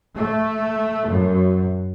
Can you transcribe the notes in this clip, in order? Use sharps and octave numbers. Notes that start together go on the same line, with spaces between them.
A3
F#2